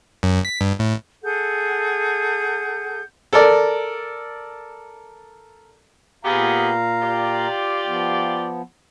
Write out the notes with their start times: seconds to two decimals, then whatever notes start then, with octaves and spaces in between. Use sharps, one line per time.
0.23 F#2
0.45 B6
0.61 G2
0.79 A2
1.23 G#4 A4 F#5 G6
3.33 A4 A#4 D5
6.25 A#2 B3 G4 G#4 F5 A#5
7.02 F4 G4 D5
7.87 F3 B3